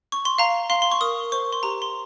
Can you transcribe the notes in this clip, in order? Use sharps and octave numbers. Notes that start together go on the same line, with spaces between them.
C#6
C6
F5 A#5
F5 C6
C6
C#6
A#4 D#6
C5 C#6
C6
G4 A#5
C6